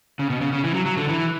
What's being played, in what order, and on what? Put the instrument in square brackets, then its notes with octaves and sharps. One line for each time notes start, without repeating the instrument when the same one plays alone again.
[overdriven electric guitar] C#3
B2
C#3
C#3
E3
F#3
F#3
D3
E3